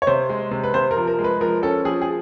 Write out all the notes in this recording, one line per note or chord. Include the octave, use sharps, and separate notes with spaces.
C#5
C3 C5
G#3
C3
B4
C3 C5
A#4
F3
A#4
G#3
B4
F3 A#4
C#4 A4
F3 G#4
G#4